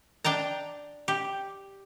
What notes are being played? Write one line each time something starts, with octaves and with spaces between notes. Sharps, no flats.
D4 G5 A5 A#5
G4